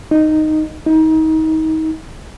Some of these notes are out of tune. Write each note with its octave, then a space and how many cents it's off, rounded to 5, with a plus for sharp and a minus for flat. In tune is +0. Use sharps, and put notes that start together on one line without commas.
D#4 -5
D#4 +30